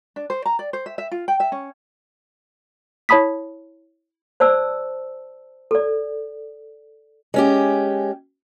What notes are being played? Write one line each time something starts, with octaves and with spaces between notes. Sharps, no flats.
D4
C5
A#5
D5
C5
E5
E5
F4
G5
E5
C#4
E4 C#5 A5 B5 D#6 B6
C5 D5 A5 E6
A4 D5
G#3 C#4 G4